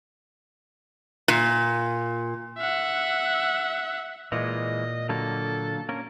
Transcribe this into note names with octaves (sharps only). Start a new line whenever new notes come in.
A#2
E5 F#5
A#2 E3 G#3 D#5
D3 F#3 A#3 A4
A#3 C#4 A#4